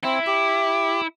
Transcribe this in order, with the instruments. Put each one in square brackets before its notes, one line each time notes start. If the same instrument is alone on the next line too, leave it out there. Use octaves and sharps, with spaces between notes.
[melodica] C4 [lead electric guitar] E4
[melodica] G4